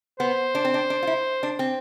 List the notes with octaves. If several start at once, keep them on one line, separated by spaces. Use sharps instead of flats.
B3 C5
D4
C4
D4
D4
F4
E4
D4
C4